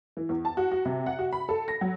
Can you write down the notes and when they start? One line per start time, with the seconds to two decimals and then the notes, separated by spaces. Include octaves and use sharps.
0.17 E3
0.29 E2
0.45 A5
0.57 F#4
0.72 F#4
0.85 C3
1.06 F#5
1.19 F#4
1.33 B5
1.49 A4
1.68 A#6
1.81 F#3